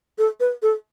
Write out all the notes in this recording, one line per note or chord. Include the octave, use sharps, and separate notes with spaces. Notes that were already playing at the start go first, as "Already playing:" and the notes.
A4
B4
A4